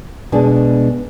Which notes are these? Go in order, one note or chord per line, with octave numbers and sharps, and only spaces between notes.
B2 G#3 D4